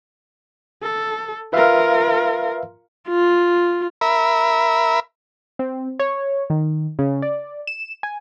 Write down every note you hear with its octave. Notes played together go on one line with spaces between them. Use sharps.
A4
F4 A#4 B4 E5 F5
F4
A#4 E5 B5
C4
C#5
D#3
C#3
D5
E7
G#5